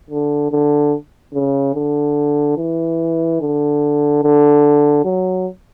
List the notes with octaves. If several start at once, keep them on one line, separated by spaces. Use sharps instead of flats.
D3
D3
C#3
D3
E3
D3
D3
F#3